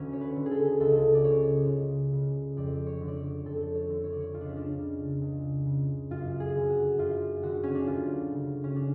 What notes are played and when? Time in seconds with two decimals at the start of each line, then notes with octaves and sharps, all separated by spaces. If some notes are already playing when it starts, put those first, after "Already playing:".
Already playing: D2 D3 C#4
0.13 C#5
0.21 B4
0.36 D3
0.46 G#4
0.51 A4
0.80 C#2 A4
1.15 D5
1.24 C#3 C#5
1.69 C#2
2.13 C#3
2.57 F2 D5
2.87 C#5
3.01 D3
3.08 D5
3.16 C#5
3.45 F2 A4
3.75 C#5
3.90 D3
4.04 C#5
4.12 D5
4.20 C#5
4.34 C#2 F4
4.41 D4
4.49 C#4
4.56 D4
4.78 C#3
5.22 C#2
5.66 C#3
6.10 F#2 F4
6.40 G#4
6.55 D3
6.70 F#4
6.98 F#2 F4
7.43 D3 F#4
7.63 C#4
7.75 D4
7.87 D2 F4
8.31 C#3
8.64 C#4
8.76 D4